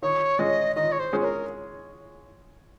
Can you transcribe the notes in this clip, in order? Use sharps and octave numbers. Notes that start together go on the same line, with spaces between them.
D#3 C#5
G#3 C#4 G#4 D#5
D#3 D#5
C#5
C5
G#3 C#4 G#4
C5
A#4